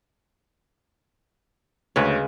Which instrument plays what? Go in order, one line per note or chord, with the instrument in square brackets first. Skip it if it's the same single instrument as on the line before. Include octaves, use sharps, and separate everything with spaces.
[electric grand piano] D2 C#5 [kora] C#3 G#3 B4